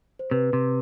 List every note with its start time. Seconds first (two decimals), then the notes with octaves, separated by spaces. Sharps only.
0.19 C5
0.31 C3 B4
0.53 C3